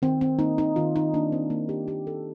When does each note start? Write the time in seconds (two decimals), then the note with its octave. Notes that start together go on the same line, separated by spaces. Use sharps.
0.02 D#3 C4
0.21 C4
0.39 A#3 D#4
0.58 D#4
0.76 D#3 F4
0.96 D#4
1.14 A#3 D4
1.32 C4
1.50 D#3 A#3
1.69 G4
1.88 A#3 G4
2.07 A4